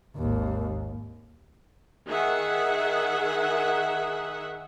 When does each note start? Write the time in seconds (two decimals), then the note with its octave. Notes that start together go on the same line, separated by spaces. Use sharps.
0.17 G#1 D#2
2.08 D#3 G#4 E5 F#5